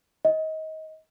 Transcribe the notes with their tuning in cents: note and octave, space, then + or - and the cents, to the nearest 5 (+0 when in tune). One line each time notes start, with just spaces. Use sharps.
D#5 +25